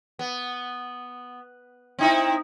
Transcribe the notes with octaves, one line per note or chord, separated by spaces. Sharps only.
B3
C4 D#4 E4